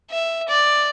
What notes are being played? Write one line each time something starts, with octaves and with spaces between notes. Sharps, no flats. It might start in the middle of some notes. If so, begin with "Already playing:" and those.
E5
D5